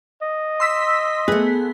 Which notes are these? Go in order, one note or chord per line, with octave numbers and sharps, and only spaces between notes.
D#5
C6 E6 B6
A3 B3 G#4